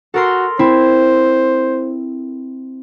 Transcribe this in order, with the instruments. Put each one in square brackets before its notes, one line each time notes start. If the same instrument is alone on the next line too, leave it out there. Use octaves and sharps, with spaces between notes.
[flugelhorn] F#4 [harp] A4 A#4 C6
[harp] C4 E4 [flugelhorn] C5